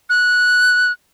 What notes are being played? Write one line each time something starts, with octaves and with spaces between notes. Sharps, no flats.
F#6